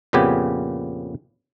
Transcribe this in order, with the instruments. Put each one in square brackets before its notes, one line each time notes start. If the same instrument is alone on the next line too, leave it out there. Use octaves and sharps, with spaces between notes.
[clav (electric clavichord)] F2 A#2 C#3 B3 G4 G#5